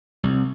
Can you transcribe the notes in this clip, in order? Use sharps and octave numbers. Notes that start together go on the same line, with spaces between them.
C2